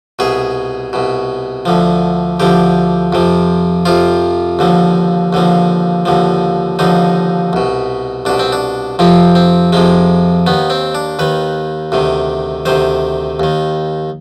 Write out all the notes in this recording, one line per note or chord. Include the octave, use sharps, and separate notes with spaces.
C2 B2 G#4
C2 B2
D2 D3 F3
D2 D3 F3 G4
F2 C3 F3
F2 C3 F3 F4
D#2 D3 F3
D#2 D3 F3
D#2 D3 F3
D#2 D3 F3 D#4
C2 B2
C2 B2 D4
C4
D4
F2 C3 F3 C4
C4
F2 C3 F3 G#3
D#2 D#3 B3
C4
D4
D#2 D#3 B4
D2 C3 D#3
D2 C3 D#3 C5
D#2 D#3